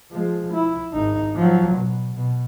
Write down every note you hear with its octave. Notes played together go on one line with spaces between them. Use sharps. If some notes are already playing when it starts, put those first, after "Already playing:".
F3 G#3
E4
G#1 D#4
F3 F#3
B2
B2